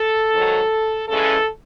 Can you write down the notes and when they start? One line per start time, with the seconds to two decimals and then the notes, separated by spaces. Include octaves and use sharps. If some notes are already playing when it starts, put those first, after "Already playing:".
Already playing: A4
0.32 G#2 D#3 F#3
1.09 C#3 E3 G#3 C#4 A4